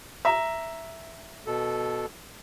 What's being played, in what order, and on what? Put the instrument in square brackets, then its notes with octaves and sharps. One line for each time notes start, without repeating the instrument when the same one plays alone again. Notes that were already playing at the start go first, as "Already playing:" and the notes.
[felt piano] E5 A#5
[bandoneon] B2 A4